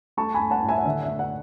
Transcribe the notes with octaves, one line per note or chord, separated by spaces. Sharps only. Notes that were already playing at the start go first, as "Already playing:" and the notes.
A3 A5 C#6
G#5 B5
A3
F#5 A5
A2
E5 G#5
F#5
D3 E5
E5
A3
F#5